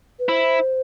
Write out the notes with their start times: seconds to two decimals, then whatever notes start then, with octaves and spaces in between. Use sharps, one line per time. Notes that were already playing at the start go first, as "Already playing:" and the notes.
0.19 B4
0.29 E4 C5